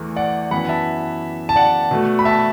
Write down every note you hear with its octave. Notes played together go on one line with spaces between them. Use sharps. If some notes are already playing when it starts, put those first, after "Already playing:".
Already playing: E2 E3 A3
D5 F#5
F#2 E3 B3 F#5 B5
E5 A5
A5
D5 F#5
B2 A3
B5
E5 A5